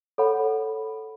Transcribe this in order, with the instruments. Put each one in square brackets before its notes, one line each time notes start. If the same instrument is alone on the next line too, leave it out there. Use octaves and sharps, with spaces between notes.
[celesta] A4 C#5 F#5 B5